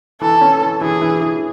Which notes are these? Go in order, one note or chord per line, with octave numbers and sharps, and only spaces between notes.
E3 A4
C#4
E3
E3 G#4
E3
E3